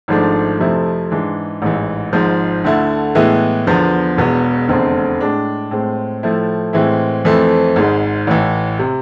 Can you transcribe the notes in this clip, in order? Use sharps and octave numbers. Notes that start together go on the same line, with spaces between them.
G#1 G#2 F3 A3 D4
F2 C3 F3 A3 E4
G#2 E3 G#3 D4
A1 G#2 E3
G#1 G#2 F3
D2 D3 A3 E4
A2 E3 G#3 B3 E4
E2 D3 F3 B3
E1 E2 B2 B3
F1 E2 D3 A3 C4
A2 G#3 D4
A2 G#3 C4
A2 F3 A3 E4
A2 E3 G#3 C4 E4
F2 E3 A3 C4
G#1 G#2 G#3
A1 A2 E3
C3